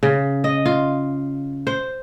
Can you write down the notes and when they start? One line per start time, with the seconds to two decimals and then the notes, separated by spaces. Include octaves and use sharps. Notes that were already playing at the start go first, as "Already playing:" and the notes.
0.03 C#3
0.44 D#5
0.66 F4
1.67 C5